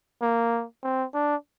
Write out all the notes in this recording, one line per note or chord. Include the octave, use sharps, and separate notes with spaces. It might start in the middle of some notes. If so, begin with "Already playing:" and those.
A#3
C4
D4